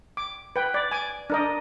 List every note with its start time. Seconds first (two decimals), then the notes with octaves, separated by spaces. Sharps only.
0.17 D6
0.56 B4 G5
0.74 D5
0.91 G#5 D6
1.30 D4 A#4 D#5